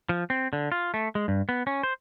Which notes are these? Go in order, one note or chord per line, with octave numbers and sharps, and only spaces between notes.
F3
C4
D3
F4
A3
G#3
G2
B3
C#4
C5